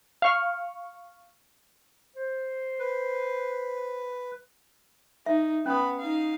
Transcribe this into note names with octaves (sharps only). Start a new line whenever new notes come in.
F5 C#6 F6
C5
B4
D#4 E5
B3 C#4 B5 D#6
D#4 F5